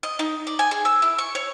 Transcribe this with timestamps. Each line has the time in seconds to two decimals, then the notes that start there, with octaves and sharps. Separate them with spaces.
0.03 D#5
0.19 D#4
0.47 D5
0.59 G#5
0.71 G#4
0.85 E6
1.02 E4
1.18 C#6
1.35 C#5